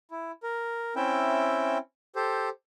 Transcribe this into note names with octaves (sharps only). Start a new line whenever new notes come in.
E4
A#4
C4 C#4 E4 E5 G5
G4 A4 C5